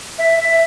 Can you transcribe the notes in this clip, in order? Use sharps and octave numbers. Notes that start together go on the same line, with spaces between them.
E5
E5